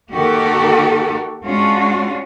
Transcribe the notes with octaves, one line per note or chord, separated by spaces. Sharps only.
D#3 A#3 F#4 G4 A4 A#4
G#3 C#4 D4 F4 F#4